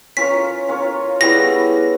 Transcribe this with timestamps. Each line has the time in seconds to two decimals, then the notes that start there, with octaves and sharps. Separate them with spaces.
0.17 C#4 F4 A#4 C#5 B6
0.68 C#4 F4 A#4 C#5
1.21 G3 B3 E4 G#4 A#6